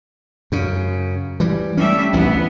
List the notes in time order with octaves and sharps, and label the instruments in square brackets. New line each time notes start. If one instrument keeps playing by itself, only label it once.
[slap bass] F#2 C#3
E3 G3
[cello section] G3 A3 E5 [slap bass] C#4
[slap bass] A1 D2 E3 [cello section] B3